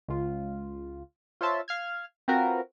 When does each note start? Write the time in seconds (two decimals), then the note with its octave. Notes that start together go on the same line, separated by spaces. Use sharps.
0.08 C#2 F4
1.41 F4 C5 C#5 E5 A5 C6
1.68 F5 F6 G#6
2.28 C4 F4 F#4 A#4 B4